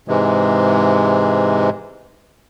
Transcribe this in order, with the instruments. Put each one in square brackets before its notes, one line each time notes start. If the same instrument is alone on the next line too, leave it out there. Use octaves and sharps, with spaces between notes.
[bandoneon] G#2 C3 E3 G#3